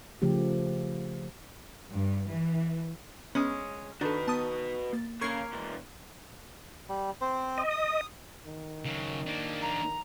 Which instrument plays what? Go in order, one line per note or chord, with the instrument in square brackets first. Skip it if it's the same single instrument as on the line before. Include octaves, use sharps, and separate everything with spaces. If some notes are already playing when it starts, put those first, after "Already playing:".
[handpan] C#3 F3 A3 G4
[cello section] G2
E3
[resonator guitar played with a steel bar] G#3 C#4 [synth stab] B3
[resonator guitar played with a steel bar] D#3 [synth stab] D4 A4 [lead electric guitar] F#4 B4 [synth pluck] C#6
[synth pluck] B3 B6 [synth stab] A5 D#6
[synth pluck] A#3 A6
[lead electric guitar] C#3 [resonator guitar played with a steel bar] A#3 A#4 [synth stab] C#6 G#6 C7 [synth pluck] F6 D#7
[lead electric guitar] B2 E3
[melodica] G3
C4 C5
[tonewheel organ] D#5
[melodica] D#6
[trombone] D#3
[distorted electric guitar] C#3 F#3
A#3 D4
[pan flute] A#5